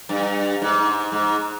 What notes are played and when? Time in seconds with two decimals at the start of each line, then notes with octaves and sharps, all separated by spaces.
0.09 G2
0.62 G#2
1.12 G#2